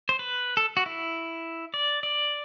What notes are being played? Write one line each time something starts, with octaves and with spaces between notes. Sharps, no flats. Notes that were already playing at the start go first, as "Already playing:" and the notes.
C5
B4
A4
F#4
E4
D5
D5